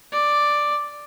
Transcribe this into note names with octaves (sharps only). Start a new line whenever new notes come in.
D5